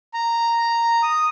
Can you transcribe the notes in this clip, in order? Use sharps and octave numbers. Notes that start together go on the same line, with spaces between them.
A#5
D#6